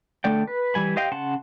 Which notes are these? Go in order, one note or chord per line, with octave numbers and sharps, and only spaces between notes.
D3 A3 D5 G5
B4
E3 G3 G#5 B5
G4 C5 D#5 F5 G5
C#3 F#5 A5 C6